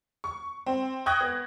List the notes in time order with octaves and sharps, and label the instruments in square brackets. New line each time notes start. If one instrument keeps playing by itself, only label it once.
[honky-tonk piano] C#6
C4
G5 C#6 D#6 F#6 G#6 A#6
B3